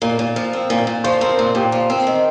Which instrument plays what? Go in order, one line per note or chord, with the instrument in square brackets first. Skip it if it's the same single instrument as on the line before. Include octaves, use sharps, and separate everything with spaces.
[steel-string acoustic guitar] A#2 [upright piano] A#4
[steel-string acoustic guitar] A#2
F3
C4
A#2
A#2
[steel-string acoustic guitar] F3 [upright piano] C5
[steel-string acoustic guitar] C4 [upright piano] A#4
[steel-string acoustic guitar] A#2 [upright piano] A#4
[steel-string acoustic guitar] A#2 [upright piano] G4
[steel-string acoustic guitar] F3
C4
D#3